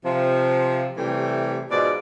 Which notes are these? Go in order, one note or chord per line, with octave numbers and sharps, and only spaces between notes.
C3 F3
C3 E3 G3 A3
G#2 B2 F3 G#3 D5